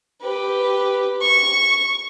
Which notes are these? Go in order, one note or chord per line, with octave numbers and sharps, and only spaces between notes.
G4 B4
C#6